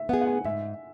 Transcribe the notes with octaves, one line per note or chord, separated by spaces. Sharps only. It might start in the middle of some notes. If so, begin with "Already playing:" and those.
Already playing: E5
B3 G#4 F#5
F#5
G#5
G#2 E5